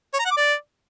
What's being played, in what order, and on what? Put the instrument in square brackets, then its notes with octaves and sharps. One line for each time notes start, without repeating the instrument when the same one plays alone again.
[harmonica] C#5
A#5
F#5
D6
D5